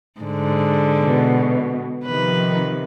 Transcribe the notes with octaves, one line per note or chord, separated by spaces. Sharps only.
G#2 D3
B2
C3 D#3 F3 B4